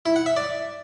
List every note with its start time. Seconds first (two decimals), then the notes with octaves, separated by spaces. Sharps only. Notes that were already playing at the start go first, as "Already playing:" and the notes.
0.06 E4
0.16 F#5
0.26 E5
0.37 D5